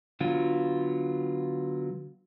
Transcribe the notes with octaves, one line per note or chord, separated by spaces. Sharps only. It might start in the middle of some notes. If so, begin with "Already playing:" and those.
D3 F#3 B3 F4